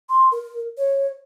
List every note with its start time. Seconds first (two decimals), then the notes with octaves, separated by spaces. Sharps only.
0.09 C6
0.32 A#4
0.77 C#5